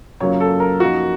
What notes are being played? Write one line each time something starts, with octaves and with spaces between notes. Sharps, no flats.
F#2 C#3 F#3 A#3 F4 C#5
A4
A#4
F#2 F3 A#3 D#4 F#4